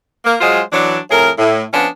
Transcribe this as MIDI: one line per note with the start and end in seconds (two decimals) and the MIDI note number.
0.25 0.35 58
0.41 0.61 54
0.41 0.61 56
0.41 0.61 65
0.41 0.61 68
0.41 0.61 72
0.73 0.98 52
0.73 0.98 54
0.73 0.98 62
1.11 1.30 41
1.11 1.30 45
1.11 1.30 68
1.11 1.30 70
1.39 1.63 45
1.73 1.88 53
1.73 1.88 59
1.73 1.88 61
1.73 1.88 62